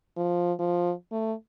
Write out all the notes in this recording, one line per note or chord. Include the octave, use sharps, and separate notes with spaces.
F3
F3
A3